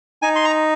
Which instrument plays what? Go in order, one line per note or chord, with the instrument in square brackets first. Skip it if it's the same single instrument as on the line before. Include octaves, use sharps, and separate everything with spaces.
[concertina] D#4 G#5
C6
A#5